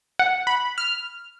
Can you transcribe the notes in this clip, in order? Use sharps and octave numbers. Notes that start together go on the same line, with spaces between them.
F#5
B5
F6